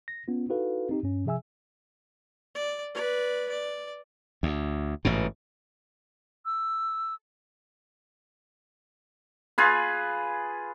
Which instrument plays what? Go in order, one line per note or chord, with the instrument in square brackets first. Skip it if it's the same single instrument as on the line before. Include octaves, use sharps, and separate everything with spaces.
[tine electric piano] A#6
B3 C#4 F4
D#4 E4 F#4 A4 B4 F5
C4 D#4 G4
G2 C#4
C3 F3 G#4 E5 G#5 E6
[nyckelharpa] D5
B4 D5
D5
[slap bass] D2
A1 G#2 B2
[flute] E6
[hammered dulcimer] F4 G#4 B4